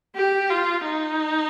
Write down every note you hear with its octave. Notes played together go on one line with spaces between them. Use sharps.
G4
F4
D#4